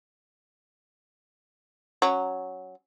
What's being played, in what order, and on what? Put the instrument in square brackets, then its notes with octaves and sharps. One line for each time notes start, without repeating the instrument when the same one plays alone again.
[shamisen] F#3 C#4